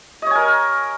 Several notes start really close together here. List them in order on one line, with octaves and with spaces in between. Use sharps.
D#5 C#5 G#5 A#4